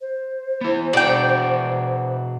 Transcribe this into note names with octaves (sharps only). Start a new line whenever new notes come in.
C5
B3 E4
B2 F#4 G#4 D5 G5